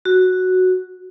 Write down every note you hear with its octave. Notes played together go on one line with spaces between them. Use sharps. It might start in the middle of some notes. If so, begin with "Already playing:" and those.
F#4